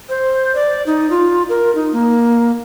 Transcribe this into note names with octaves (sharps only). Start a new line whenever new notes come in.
C5
D5
D#4
F4
A#4
D#4
A#3